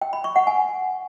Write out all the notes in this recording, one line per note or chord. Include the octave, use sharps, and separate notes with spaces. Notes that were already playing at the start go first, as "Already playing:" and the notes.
G5
B5
C#6
F#5
G#5